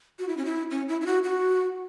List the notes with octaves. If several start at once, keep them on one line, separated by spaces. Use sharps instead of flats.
F#4
E4
C#4
E4
C#4
E4
E4
F#4
F#4